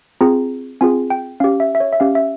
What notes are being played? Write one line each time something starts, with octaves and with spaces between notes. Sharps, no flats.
C4 F4 G#4 A#5
C4 F4 G#4 G#5
G5
C#4 G4 F5
E5
E5
C#5
E5
C#4 G4 F5
E5